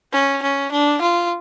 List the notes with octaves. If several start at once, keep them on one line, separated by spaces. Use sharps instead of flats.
C#4
C#4
D4
F4